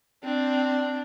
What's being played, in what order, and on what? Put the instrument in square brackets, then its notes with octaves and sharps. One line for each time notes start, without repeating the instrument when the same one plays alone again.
[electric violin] C4 [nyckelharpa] D4